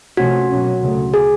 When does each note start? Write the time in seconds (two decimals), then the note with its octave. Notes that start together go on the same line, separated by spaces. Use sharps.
0.17 C3 F3 A3 C#4 F#4
0.50 B2 F#3 A#3 C#4
0.81 D2 C#3 F#3 A3
1.14 G#4